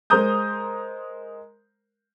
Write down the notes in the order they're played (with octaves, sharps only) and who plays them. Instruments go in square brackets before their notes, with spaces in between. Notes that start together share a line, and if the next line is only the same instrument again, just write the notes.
[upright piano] G#3 A#4 C5 A#5 D#6 G6